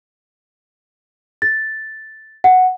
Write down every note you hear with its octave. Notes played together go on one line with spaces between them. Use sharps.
A6
F#5